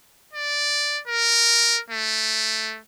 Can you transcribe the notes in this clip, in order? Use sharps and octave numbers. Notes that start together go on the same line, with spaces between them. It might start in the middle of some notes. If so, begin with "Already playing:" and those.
D5
A#4
A3